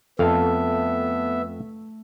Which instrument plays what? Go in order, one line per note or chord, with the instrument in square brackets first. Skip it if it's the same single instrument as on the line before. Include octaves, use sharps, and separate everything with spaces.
[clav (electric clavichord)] F2 F5 [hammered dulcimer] A3 [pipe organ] B3 E5 [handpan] A4